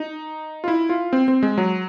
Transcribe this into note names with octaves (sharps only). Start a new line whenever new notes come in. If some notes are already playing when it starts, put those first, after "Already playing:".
Already playing: D#4
F4
E4
F4
C4
C4
G#3
F#3